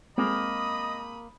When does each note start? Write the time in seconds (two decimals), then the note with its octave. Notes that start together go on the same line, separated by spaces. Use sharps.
0.18 G#3 A#3 C4 D#5 B5 D#6